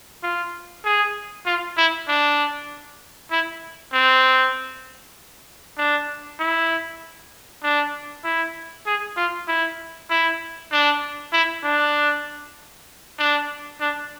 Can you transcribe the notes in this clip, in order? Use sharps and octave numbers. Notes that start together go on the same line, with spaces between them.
F4
G#4
F4
E4
D4
E4
C4
D4
E4
D4
E4
G#4
F4
E4
E4
D4
E4
D4
D4
D4